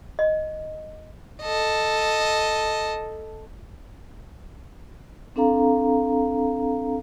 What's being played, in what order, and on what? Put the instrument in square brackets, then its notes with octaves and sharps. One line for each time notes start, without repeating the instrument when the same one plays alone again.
[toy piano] D#5
[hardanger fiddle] A4 D#5
[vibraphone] C4 D4 A4 F5 A#5